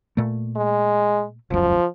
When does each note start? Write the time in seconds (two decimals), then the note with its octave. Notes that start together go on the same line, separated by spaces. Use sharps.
0.17 A#2 A3
0.56 G#3
1.50 E1 C#2 F#2 F3